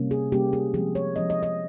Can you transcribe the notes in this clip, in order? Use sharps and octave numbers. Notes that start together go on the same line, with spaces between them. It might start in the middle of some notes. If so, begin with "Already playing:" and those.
Already playing: C3 G3 A#3 C#4
G#4
C3 G3 A#3 C#4 G4
G#4
F3 G#3 C4 G#4
C#5
F3 G#3 C4 D#5
D#5
D#5